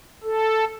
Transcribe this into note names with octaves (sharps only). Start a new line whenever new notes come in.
A4